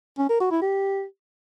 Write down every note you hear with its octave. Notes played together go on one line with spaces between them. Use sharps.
C#4
A#4
F#4
E4
G4